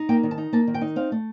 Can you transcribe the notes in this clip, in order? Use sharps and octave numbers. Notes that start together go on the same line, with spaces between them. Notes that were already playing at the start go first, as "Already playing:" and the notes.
Already playing: D#4
A#3 G5
D#3
A5
D#4
A#3 A5
D#3
G5
D#4
C4 F5
A3